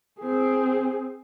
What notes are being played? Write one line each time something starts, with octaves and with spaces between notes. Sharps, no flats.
C4 G#4